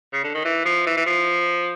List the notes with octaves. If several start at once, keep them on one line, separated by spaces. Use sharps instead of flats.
C#3
D3
D#3
E3
F3
E3
E3
F3